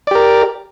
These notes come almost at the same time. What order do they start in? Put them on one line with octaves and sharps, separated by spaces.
D5 G4 A#4